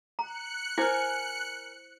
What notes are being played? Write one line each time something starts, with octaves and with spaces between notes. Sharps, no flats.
A#5 F#6 C#7
E4 A#4 C5 G#5